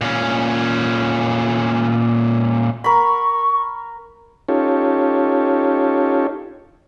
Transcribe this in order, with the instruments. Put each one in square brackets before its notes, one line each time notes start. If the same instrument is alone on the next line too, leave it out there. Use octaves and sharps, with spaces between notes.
[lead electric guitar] A#2 C#4
[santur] A#4 B5 [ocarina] C#6
[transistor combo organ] C#4 D#4 F4 G4 A4 C#5